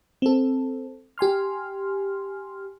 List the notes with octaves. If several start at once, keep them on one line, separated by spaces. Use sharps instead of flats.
C4 A4
G4 G#5 C6 F6